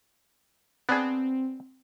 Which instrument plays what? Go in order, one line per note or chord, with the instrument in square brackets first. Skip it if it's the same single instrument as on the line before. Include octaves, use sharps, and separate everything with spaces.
[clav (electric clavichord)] B3 D4 G#4 [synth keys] C4